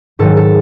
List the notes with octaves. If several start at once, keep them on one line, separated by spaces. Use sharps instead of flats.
G#2 D#3 F#3 A4
A4